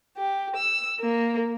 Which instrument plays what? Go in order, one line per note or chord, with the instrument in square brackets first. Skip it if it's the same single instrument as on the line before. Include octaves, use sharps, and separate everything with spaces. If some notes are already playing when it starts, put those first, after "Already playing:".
[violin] G4
E6
A#3